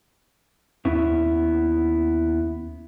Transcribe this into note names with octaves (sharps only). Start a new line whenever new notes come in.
D#2 B3 C#4 E4